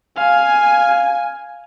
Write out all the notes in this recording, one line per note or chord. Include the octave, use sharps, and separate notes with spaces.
F5 G#5